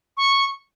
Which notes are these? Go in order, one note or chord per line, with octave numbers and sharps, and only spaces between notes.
C#6